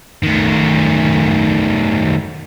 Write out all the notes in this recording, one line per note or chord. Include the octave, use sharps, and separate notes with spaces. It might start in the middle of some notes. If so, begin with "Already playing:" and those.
D#3 A3